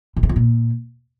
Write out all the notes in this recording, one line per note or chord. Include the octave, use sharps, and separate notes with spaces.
A2
C3
F2
A#2